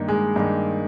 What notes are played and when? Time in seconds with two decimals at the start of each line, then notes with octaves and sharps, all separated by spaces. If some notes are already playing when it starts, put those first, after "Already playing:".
Already playing: G2 D#3 A#3 D#4
0.08 G#3
0.36 G2 D#3 A#3 D#4